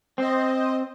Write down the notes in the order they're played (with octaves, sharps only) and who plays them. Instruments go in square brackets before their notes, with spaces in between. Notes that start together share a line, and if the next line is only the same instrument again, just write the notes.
[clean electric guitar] C4 [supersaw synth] C5 D#5